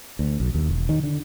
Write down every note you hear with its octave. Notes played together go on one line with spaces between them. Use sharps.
D2
B1
D#2
E1
D#3
D3